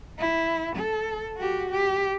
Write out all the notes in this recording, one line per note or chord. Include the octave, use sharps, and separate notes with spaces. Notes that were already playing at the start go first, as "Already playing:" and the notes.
E4
A4
F#4 G4
G4